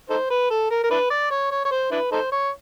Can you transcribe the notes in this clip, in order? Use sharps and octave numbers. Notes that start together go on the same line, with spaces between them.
D#4 A4 C5
B4
A4
A#4
A#4
D4 E4 B4
D5
C#5
C#5
C#5
C5
D4 E4 B4
D#4 A4 C5
C#5